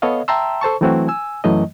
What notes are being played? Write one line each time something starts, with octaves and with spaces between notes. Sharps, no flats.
B3 A4 C#5 D#5 F5
E5 G5 A5 A#5 C6 E6
A4 C5 A5 C#6
E3 F#3 A3 C4 E4 F#4
G#5 E6
F#2 E3 F#3 A3 D#5